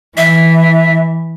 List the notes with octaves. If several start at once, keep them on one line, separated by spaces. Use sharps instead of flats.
E3 E5